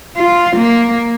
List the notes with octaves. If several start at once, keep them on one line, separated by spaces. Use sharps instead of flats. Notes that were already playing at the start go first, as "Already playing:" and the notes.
F4
A#3